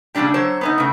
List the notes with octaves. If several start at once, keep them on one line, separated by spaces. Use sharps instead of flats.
A#2 C#3 E3 G3 D4 G4
F#3 C5 C#5
B3 C#4 D#4
A2 C#3